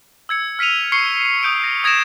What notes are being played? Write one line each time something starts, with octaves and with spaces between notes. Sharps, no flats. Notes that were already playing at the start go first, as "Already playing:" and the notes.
E6 G#6 C#7
F6 B6 C#7 D#7 F7
C#6 F6 C7 C#7 G7
D#6 G6 D7
A#6
D#6 G#6 A#6 D7 E7